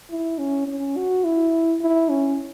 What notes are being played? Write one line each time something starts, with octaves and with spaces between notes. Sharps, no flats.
E4
C#4
C#4
F#4
E4
E4
C#4